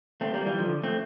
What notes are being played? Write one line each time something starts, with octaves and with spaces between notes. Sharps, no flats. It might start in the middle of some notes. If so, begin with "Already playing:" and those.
A3 C4
G3 A#3
E3 G3
D3 F3
A3 C4